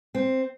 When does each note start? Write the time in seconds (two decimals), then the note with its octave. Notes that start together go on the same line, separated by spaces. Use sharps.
0.15 C4